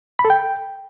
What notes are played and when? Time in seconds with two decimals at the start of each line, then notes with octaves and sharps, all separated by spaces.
0.19 B5
0.25 A4
0.30 G5